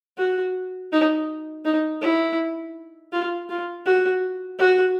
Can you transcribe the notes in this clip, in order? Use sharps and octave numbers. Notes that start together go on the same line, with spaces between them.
F#4
D#4
D#4
E4
F4
F4
F#4
F#4